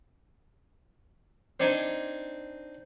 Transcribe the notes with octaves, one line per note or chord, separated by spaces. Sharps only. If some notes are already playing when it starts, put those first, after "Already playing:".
C4 D4 D#4 G#5